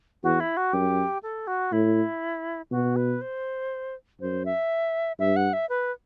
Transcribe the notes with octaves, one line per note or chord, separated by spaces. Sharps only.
E2 F#4
E4
F#4
F#2 G4
A4
F#4
A2 E4
B2 F#4
B4
C5
F#2 C5
E5
G2 E5
F#5
E5
B4